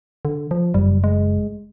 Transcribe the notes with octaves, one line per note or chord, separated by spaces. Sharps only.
D3
F3
F#1 G3
G#3